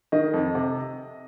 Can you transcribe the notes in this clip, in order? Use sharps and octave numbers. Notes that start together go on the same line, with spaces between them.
D#3 D#5
F2
C3